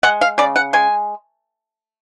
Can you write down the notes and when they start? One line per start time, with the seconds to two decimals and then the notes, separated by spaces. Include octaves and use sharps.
0.03 G#3 F#5
0.21 F5
0.38 C#3 D5
0.56 F#5
0.73 G#3 G#5